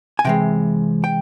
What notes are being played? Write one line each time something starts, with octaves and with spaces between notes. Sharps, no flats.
G#5
C3 E3 G#3 G5
G5